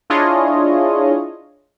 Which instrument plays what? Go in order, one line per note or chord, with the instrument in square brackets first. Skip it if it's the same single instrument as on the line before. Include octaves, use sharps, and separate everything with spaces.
[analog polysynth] D4 E4 F4 G#4 C#5 D#5